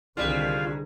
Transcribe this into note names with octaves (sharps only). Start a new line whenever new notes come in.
C2 D3 D#3 G3 G#3 F4